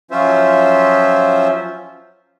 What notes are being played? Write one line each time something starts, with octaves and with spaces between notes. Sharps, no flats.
F3 F#3 C#4 F4 C5 E5